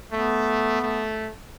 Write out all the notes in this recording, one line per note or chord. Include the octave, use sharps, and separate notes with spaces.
A3 B3
A3